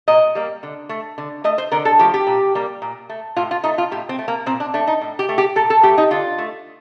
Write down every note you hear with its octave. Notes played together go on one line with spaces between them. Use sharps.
A#2 D#5
G3 A#3
D3
A3
D3
A3 D#5
C5
D3 A#4
A4
F3 A3 G4
G4
A#2
G3 A#3
A#2
A3
A2 F4
F4
A3 D#4
F4
A2 G4
C4
A3
A#3
A#2 C4
D4
A3 D4
D#4
A2
G4
A3
G4
A#2 A4
A4
A3 G4
D#4
D3 F4
A3